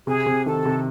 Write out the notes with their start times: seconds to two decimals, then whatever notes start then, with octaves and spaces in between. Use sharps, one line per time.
0.07 C3 G#4
0.26 C3
0.46 D#3 A4
0.65 C3